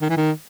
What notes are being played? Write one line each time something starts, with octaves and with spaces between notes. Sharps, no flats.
D#3
E3
D#3